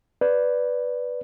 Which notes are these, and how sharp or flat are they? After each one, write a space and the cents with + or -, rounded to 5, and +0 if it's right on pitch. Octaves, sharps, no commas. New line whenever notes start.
B4 +0 D5 +0